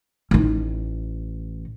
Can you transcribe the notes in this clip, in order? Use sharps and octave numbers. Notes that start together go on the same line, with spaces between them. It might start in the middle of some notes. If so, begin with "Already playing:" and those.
A1 D#4